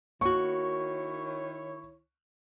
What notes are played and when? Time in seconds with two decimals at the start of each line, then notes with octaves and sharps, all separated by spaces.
0.21 D#3 A#3 E4 F#4 C#5 C#6